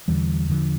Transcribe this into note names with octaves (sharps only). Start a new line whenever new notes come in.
E2 D3 E3 G3
D3 F3